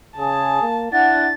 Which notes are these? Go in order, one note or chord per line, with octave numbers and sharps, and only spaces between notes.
C#3 G#4 A5
A#3
D4 E4 F#5 A6